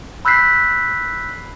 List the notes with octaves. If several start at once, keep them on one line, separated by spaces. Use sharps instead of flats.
B5 E6 F#6 G6 B6 C7